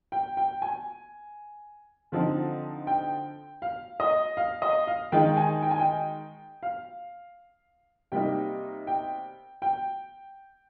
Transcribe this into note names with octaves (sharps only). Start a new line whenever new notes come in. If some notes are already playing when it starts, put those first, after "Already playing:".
G5
G5
G#5
D3 F3 C4 D#4
G5
F5
D#5
F5
D#5
F5
D#3 G#3 D#4 G5
G#5
G5
G#5
G5
F5
C3 G3 A#3 D#4 G5
G5
G5